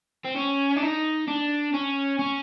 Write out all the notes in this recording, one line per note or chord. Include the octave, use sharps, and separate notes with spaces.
C4
C#4
D4
D#4
D4
C#4
C#4